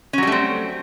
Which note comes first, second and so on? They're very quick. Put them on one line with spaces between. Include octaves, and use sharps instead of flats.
C#4 F#3 G3 A3 C4